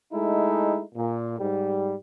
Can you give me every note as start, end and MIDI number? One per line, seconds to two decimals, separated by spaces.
0.13 0.81 56
0.13 0.81 57
0.13 0.81 63
0.13 0.81 64
0.95 1.38 46
1.39 1.93 44
1.39 1.93 55